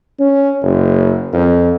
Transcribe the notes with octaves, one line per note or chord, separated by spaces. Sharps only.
C#4
F#1
F2